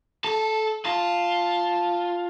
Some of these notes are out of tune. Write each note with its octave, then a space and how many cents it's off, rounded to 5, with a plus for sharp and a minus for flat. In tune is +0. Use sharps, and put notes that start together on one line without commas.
A4 -15 A5 +0
F4 +0 A5 +0